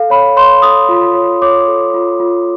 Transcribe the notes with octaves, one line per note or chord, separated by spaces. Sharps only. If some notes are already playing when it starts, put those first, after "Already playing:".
Already playing: A4 F5
C#5 B5
C#5 C6
A4 D#6
F4
C#5
C#5 D6
A4
F4
F4